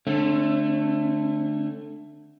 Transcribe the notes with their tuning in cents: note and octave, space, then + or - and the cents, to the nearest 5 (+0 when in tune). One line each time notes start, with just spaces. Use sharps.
D3 +20 A3 +10 C#4 -35